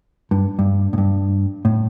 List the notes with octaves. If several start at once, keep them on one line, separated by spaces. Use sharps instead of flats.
G2
G2
A2
G2
A2